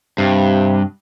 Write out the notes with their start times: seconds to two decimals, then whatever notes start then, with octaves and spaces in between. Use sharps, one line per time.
0.18 G2 C3